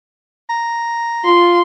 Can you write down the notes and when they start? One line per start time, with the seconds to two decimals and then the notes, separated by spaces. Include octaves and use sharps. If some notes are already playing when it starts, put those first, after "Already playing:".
0.49 A#5
1.25 F4 C6